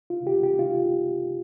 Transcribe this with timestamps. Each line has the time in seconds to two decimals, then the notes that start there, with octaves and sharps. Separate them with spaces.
0.10 F4
0.27 G4
0.43 G4
0.59 F4